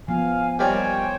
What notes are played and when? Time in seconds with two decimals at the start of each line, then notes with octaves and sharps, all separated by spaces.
0.08 F3 B3 F5 G#5
0.59 D#2 G3 A#4 C5 C#5 G5